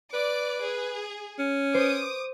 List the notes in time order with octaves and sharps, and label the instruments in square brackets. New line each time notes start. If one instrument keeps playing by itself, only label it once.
[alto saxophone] B4 [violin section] D5 D6
[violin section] G#4
[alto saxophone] C#4
[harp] C5 [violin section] D6 D#6